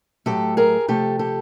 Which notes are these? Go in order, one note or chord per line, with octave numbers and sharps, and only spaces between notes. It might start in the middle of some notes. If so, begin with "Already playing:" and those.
A2 F#3 A3 G4 A4
G#4 A#4
C3 F3 A3 G4 A4
G4 A4